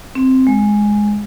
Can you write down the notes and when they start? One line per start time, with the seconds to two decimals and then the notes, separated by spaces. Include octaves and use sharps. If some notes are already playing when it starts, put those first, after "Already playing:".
0.15 C4
0.47 G#3